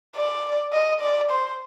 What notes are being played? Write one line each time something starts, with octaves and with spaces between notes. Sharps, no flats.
D5
D#5
D5
C5